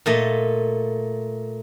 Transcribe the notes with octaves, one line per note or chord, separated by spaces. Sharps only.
A#2 A3 D#5